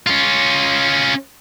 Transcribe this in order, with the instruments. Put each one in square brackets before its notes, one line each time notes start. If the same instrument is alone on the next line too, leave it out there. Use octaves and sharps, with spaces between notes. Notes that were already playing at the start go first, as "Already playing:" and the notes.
[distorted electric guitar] C#4 F4